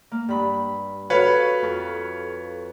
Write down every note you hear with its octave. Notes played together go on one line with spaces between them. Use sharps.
A#3
G2 B5
F#4 A4 B4 C#5 F5 B5
F2 C#6